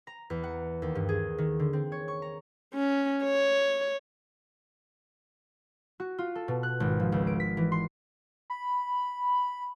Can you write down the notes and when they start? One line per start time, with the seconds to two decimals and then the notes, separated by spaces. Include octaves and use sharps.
0.07 A#5
0.30 E2
0.43 F#5
0.82 D#2
0.95 G2
1.09 G#4
1.38 D#3
1.59 D3
1.73 C4
1.92 C#5
2.08 C#6
2.22 A#5
2.74 C#4
3.24 C#5
6.00 F#4
6.18 F4
6.35 A4
6.48 B2
6.63 F#6
6.80 G#1
7.00 F3
7.12 C#2
7.27 D7
7.40 B6
7.57 E3
7.72 C6
8.50 B5